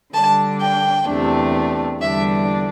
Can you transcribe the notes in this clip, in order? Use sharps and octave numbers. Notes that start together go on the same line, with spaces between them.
D3 G3 D4 A5
G5
E2 C3 A3 D4
E2 D3 G3 D4 E5